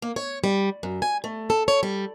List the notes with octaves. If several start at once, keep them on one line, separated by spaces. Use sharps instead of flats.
A#3
C#5
G3
F#2
G#5
A3
A4
C#5
G3